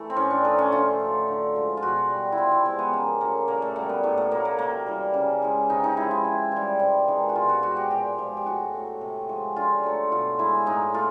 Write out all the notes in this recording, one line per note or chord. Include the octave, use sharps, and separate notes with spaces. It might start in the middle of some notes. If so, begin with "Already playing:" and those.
Already playing: E3 A3
C4
A2 C#4
D4
F3 A3 D#4
C#4
D3 F4
F#3 A3
D3
F3 G#3
F4
B2 F#4
G3
E4
C3 F4
E4
F3 G#3 C4
B3
C#3 A#3
F#3 A3 A#3
A#2 A#3
A3
G3 A#3
B3
A2 A3
A#3
F#3 A3 A#3
A#3
C3 A#3
E3 G3
C#3
E3 G#3
C3 D#4
D#4
F3 G#3 E4
E4
C3
E3 G3
C3
D#3 G#3
F#4
B2 F4
F#4
G#3 F#4
G4
A#2 G4
F3 G#3
G4
A2 F#4
F#3 A3
C3
F3 G#3
D3 F4
F#3 A3
B2 F4
G#3 E4
A2 D#4
A3 F4